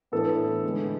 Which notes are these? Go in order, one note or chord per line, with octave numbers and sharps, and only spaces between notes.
A2 E3 B3 D4 A4
D3 G#3 B3 D4